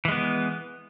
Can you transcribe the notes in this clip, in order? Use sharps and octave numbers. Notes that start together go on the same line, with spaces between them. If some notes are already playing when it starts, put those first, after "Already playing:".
E3 G#3 B3